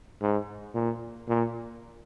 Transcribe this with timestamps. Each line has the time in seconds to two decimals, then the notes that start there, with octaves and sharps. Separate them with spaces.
0.21 G#2
0.74 A#2
1.28 A#2